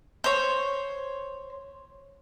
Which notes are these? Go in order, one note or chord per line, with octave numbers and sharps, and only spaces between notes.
C5 C#5